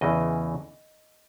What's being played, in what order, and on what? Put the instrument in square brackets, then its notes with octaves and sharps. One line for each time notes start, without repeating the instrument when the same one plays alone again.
[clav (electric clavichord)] E2 C#3 E3 D#5